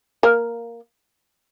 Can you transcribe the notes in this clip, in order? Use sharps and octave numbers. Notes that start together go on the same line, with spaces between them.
A#3 A#4